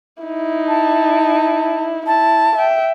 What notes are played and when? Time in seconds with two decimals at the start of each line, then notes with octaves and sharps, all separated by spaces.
0.23 D#4 E4
0.67 A5
2.06 E4 A5
2.56 E5 G5